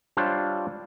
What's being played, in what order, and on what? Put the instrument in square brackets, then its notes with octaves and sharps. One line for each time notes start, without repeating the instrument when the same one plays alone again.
[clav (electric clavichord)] G3 D4 F4 C5 C#5 E5